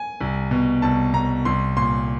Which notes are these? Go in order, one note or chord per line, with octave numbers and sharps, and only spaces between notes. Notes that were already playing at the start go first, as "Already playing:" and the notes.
Already playing: G#5
C2
B2
C2 A5
B2 A#5
C2 C6
A#2 C6